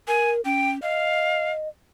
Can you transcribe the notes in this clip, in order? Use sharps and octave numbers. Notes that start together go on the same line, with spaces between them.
A#4 G#5
C#4 G5
D#5 F5